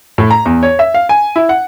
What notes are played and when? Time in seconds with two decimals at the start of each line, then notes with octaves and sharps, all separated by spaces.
0.18 A2
0.31 A#5
0.45 E2
0.63 C#5
0.79 E5
0.94 F5
1.09 G#5
1.36 E4
1.49 F#5